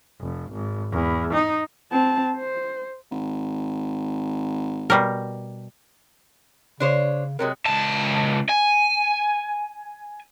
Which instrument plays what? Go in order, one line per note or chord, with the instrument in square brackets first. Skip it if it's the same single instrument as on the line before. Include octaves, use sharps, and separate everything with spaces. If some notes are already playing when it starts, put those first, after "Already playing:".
[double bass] F1
G#1
E2
D#4
[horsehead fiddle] C4 A5
C5
[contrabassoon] G#1
[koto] B2 G3 A#4
[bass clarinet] C#3 [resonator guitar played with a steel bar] D4 C5 C#5
[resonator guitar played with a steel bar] C3 F#3 G#3 [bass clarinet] A#4
[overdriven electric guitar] C#2 A5
G#5